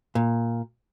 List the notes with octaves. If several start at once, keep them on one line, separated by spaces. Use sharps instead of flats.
A#2